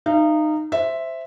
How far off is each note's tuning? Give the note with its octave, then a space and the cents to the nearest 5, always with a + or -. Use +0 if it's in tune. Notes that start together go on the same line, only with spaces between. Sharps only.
D#4 -20 F5 -40
C5 +0 E5 +0